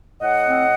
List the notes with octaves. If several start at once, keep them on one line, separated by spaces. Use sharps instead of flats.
A2 D#5 F#5
C4